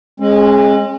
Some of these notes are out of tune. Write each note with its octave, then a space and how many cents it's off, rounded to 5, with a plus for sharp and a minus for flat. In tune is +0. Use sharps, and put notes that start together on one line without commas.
G#3 +0 C#4 -40